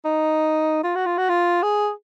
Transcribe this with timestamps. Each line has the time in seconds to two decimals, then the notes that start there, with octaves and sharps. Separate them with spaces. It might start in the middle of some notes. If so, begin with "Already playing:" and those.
0.05 D#4
0.84 F4
0.96 F#4
1.06 F4
1.18 F#4
1.29 F4
1.63 G#4